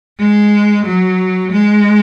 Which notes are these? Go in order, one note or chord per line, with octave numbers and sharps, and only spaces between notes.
G#3
F#3
G#3